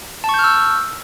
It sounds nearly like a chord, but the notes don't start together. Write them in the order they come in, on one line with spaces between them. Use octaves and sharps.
A5 C#6 G6 F6 E6